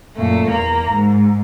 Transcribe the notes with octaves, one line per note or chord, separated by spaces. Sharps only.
F#2 A#2 A3
E2 A#3 A#5
G#2